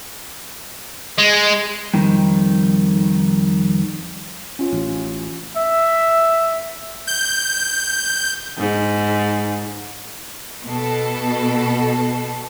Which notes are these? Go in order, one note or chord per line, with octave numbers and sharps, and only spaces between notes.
G#3
F2 C3 D#3 G3
C#4 F4
A1
E5
G6
G#2
B2 A4